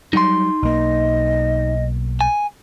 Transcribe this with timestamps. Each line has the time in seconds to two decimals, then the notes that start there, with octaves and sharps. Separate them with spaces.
0.13 F#3 G3 D#4 C6
0.63 B1 A#3 D#5
2.21 G#5